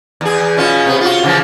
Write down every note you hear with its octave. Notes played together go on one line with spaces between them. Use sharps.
E2 G#4
B2 C#4 F4
C3 B3
F4 F#4
C#3 E3 F3